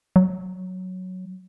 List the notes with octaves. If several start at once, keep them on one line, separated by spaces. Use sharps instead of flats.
F#3